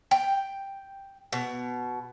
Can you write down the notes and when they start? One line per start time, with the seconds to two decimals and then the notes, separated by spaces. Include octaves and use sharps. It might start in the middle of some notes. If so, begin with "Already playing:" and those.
0.11 G5
1.33 B2